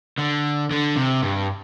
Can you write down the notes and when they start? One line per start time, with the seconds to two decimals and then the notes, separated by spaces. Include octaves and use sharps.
0.19 D3
0.71 D3
0.96 C3
1.22 G2